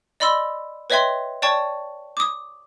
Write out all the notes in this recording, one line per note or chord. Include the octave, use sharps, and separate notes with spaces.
D5 D#5 B5 C6 E6
B4 C#5 D#5 E5 G5 C6
C#5 D5 G5 A5 C#6
D6 D#6